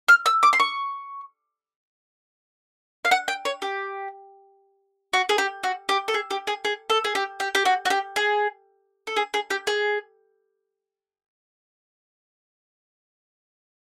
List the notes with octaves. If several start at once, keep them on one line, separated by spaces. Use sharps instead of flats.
F6
E6
D6
C6
C#6
F5
F#5
G5
C#5
G4
F#4
G#4
G4
F#4
G4
A4
G#4
G4
G#4
G#4
A4
G#4
G4
G4
G4
F#4
F#4
G4
G#4
A4
G#4
G#4
G4
G#4